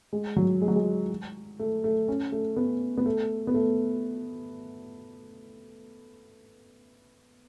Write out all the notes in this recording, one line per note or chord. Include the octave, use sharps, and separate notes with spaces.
G#3
F#3
G#3
F#3
G#3
A3
A3
C#4
A3
B3
B3
A3
B3
A3